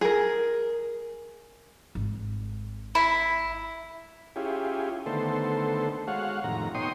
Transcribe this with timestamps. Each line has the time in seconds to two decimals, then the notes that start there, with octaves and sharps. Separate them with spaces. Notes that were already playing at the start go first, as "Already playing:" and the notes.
0.01 G#4 A#4
1.95 G#1
2.95 E4
4.36 C#4 E4 F4 G4 G#4
5.06 D3 D#3 A3 B3 A4 C5
6.07 G#3 F#4 C#5 F5 F#5
6.44 F2 A2 C3 D#3 A#5
6.75 B2 D#4 C#5 G5 C6 D#6